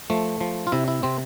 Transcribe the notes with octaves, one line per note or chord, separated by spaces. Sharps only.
F3 A3
F3
F4
C3 E4
E4
C3 C4